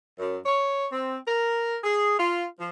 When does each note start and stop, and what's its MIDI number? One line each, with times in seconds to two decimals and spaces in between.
0.19 0.36 42
0.45 0.85 73
0.92 1.16 60
1.26 1.77 70
1.83 2.18 68
2.18 2.43 65
2.58 2.69 53